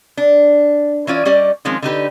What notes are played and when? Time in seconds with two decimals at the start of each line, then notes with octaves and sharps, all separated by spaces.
0.17 D4
1.07 E3 C#4 F4 D5
1.25 G3 C#4 G4 D5 D#5
1.65 D#3 F3 G#3 C4 C#4
1.82 D3 D#4 G4 B4